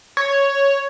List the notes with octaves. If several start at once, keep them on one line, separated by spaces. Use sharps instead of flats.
C#5